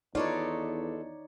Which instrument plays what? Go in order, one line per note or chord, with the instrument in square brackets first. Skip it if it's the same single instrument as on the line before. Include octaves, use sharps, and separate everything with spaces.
[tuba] E2 [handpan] D#4 C#5 D5 [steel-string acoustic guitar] F4 A4 B4